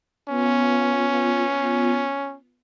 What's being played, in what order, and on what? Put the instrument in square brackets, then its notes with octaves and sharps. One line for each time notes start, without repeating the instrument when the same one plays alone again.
[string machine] B3 F4 [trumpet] C#4